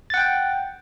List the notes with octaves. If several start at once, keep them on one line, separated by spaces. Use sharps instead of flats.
F#5 G5 A6